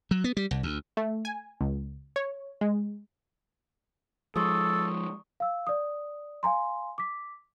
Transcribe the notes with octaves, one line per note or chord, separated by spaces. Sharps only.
F#3
B3
G3
C2
D2
A3
G#5
C#2
C#5
G#3
F3 G#3 A4 C6 C#6 D#6
F5 E6
D5 D#6
F5 G#5 A#5 C6
D6 B6